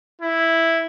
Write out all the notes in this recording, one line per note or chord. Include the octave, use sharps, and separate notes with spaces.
E4